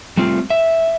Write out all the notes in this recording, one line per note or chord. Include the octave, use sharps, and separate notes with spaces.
G3 A3 C4 F4
E5